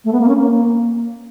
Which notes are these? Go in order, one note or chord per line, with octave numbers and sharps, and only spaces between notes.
A3
B3
A#3
C#4
A#3